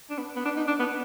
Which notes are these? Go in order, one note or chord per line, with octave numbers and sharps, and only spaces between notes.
D4
B3
B3
D4
D#4
D4
B3